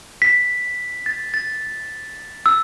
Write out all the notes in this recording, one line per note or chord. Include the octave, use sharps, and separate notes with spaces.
B6
A6
A6
E6